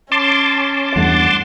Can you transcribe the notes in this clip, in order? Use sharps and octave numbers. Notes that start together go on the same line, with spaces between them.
C#4 A5 C6 D6
E2 G2 A3 F#5